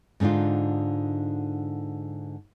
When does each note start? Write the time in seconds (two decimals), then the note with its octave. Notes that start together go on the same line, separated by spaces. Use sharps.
0.20 G#2 D3 D4 D#4 F4